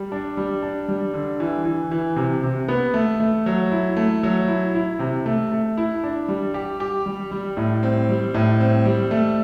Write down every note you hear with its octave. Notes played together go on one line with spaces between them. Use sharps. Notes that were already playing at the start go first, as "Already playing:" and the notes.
Already playing: G3
D4
G3
D4
G3
D3
E3
E3
E3
C3
C3
B3
A3
A3
F#3
E4
A3
F#3
E4
E4
C3
A3
A3
E4
D4
G3
G4
G4
G3
G3
A2
C4
G3
A2
C4
G3
A3